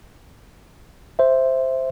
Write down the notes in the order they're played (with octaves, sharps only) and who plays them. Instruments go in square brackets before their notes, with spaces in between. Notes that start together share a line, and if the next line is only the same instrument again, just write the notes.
[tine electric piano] C5 E5